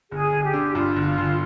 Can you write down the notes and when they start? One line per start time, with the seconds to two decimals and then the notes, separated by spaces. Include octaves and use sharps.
0.11 G1 G#4
0.32 G1
0.43 G4
0.53 D3
0.75 G2 F4
0.96 G1
1.06 F4
1.17 G1